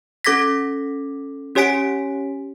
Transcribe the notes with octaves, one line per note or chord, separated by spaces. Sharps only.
C#4 A4 D6 G#6 A#6 B6
C#4 G4 C#5 G#5 B6 D7